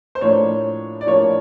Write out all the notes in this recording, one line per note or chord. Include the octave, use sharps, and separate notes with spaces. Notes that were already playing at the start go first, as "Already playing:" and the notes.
C5
A2 F3 A#3 D4 C#5
D5
A2 F3 A#3 D4 C#5